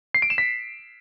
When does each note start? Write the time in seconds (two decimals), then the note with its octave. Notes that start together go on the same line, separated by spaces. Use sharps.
0.15 C7
0.22 D7
0.30 E7
0.38 B6